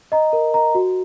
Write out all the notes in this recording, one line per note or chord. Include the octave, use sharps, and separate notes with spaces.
D#5 A#5
A#4
D#5 A#5
F#4